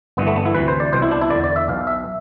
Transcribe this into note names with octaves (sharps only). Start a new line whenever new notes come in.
G1 G2 E3 B3
A3
B3
E4
D2 C3 E3 B4
C5
D5
C2 B2 C5
E4
D4
E4
E2 D3 D5
D5
E5
B1 B2 F5
E5